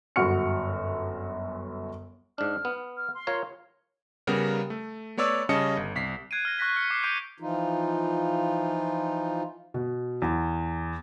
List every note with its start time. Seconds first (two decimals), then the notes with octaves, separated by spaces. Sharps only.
0.16 G1 F#2 F#4 C#6 F6 C#7
2.38 G#2 D4 F6
2.65 B3
2.97 F6
3.15 C6
3.27 F4 A#4 C#5
4.27 C#3 G3 B3 A#4 F#5 A#5
4.70 A3
5.17 A3 B3 C#5 D5 E6
5.49 C#3 G3 C#4 D#5 A5 C#7
5.77 G1
5.95 C2 B6 C7
6.31 F#6 G#6 C7 D7 D#7
6.45 F6 A#6
6.58 C#6 F#6 A#6 B6 G7
6.76 F6 B6 C#7
6.90 D6 G6 C7
7.03 C#6 G6 D7 D#7 F7
7.40 E3 F3 D#4 F4
9.74 B2
10.22 E2